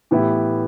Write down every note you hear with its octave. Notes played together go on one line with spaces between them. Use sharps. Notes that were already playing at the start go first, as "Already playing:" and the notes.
A2 E3 B3 E4 G4